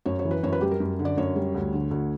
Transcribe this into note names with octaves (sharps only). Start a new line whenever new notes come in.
F#2 C#5
C#5
E3
B4
F#2 C#5
B4
G3 G4
A#4
F#2
D3
D5
F#2 C#5
G3
D2
D3
D2